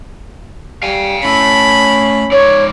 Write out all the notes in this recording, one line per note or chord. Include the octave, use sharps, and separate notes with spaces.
G3 F5 G#5
A3 C#4 E4 B5
G#2 C#5 D5